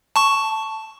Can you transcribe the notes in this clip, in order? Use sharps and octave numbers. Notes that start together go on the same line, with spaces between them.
A5 C#6